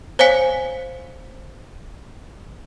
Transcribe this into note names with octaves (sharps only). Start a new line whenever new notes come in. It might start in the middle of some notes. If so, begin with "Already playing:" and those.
C5 C#5 F5 G#5 B6 C#7